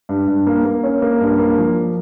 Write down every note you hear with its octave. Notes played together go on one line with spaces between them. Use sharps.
G2
G2
A#3
A#3
C#4
A#3
G2
A#3
F3